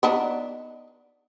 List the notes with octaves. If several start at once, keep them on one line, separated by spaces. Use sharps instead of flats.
B3 D4 D#4